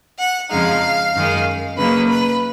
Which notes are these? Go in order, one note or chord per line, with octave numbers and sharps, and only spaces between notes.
F#5
F2 C#3 F3 G#3 D#4 F5
F#2 D#3 G#3
C#3 F#3 A#3 D#4 B4
B4